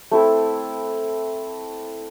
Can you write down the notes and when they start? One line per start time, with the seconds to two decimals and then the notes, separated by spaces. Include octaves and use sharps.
0.11 A3 C4 E4 A4